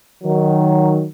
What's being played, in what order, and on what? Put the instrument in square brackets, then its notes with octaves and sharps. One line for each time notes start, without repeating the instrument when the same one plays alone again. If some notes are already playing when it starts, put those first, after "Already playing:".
[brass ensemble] D#3 F#3